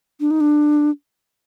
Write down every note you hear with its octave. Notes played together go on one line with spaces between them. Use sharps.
D4
D#4
D4